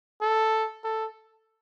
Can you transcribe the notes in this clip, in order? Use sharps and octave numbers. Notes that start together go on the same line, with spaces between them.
A4
A4